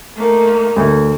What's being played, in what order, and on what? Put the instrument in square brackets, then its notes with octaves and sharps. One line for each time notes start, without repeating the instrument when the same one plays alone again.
[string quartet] A3 A#3 D#4
[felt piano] D2